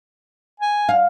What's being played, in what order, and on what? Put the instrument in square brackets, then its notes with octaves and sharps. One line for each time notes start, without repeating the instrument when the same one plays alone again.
[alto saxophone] G#5
[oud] F5